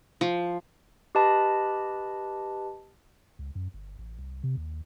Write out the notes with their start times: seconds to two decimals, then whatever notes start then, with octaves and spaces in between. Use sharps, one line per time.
0.21 F3
1.15 G4 B4 D#5 A5 B5
3.39 C#2
3.55 F#2
3.74 G1
3.99 A1
4.18 C2
4.43 C3
4.57 D#2